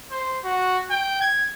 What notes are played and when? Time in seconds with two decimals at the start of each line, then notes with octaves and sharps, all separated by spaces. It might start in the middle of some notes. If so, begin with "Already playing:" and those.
0.11 C5
0.44 F#4
0.90 G5
1.21 G#6